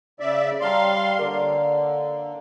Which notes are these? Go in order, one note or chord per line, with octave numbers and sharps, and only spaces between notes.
C#3 D5 E5
G3 C#5 F5 A5 A#5 C6
D3 A#3 D5 F5